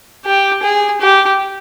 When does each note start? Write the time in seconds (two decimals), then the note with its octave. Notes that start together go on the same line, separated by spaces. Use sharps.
0.25 G4
0.63 G#4
1.01 G4